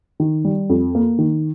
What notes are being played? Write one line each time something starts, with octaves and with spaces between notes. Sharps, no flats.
D#3
G3
F2
A#3
D#3